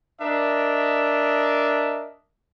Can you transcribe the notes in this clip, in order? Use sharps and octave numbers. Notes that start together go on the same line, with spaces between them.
D4 A#4 D#5 E5